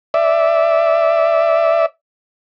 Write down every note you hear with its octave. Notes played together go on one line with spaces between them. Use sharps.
D5 E5